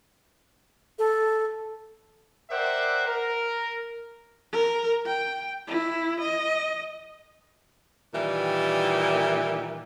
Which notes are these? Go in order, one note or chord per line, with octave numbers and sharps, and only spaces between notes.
A4
A#4 C5 D5 E5 F#5 G5
A#4
A#4
G5
E4
D#5
A#2 D#3 E3 G3